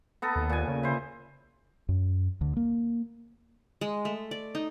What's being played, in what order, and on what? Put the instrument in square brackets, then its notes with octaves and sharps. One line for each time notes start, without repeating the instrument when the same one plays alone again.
[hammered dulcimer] B3 A4 A#5
[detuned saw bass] D#2
[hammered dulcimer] A#2 G#5
[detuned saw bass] C#3
[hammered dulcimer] E4 C5
[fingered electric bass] F#2
D2 D3
A#3
[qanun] G#3
A3
D5
D#4